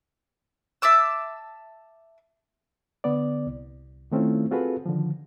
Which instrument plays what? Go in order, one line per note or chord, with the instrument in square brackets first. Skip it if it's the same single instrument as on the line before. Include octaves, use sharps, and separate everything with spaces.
[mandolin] E5 A5 D6 E6
[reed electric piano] D3 B3 D5
C2
D#3 A3 C4 C#4 E4 F4
C4 F4 F#4 G#4 A4 B4
D3 D#3 F3